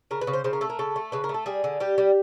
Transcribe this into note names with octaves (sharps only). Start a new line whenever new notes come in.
C#3 A#4
B4
C#3
C5
C#3 C5
A#4
A3 A4
A#4
C#3 A4
A3
C#3 B4
A#4
A3
A4
G3 G#4
D3
G3 G4
G3